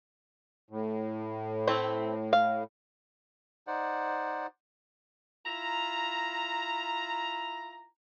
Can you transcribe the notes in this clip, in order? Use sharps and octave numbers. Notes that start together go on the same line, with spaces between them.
A2
A3 C4 E4
F5
D#4 C5 D5 F#5
E4 F4 A#5